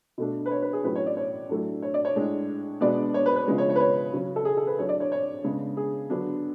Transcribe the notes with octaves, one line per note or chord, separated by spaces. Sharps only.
B2 A3 D4
B4
C#5
B4
G#4
A2 F#3 C#4 B4
C#5
D5
C#5
A2 F#3 A3 D4
C#5
D5
C#5
A2 G#3 D4
B2 G#3 B3 D4 D5
C#5
B4
B4
C#3 F3 G#3 B3
C#5
C#5
B4
C#5
C#3 F#3 C#4
A4
G#4
A4
B4
A2 F#3 A3 D4 C#5
D5
C#5
C#5
C#3 G#3 B3 D4
G#4
D3 F#3 B3 D4